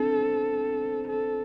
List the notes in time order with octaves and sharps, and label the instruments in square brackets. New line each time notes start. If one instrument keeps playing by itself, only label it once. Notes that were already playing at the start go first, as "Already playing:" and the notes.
Already playing: [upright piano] C4 D4 [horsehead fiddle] A4
[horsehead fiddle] A4